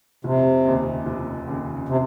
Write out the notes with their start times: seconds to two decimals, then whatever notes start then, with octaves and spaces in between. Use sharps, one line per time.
0.24 F1 C3
0.65 D#2 C#3
1.06 F1
1.47 D#2 C#3
1.89 C3